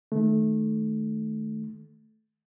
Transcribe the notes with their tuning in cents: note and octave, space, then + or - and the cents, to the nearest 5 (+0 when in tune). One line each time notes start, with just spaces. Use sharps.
D#3 +0 A3 -15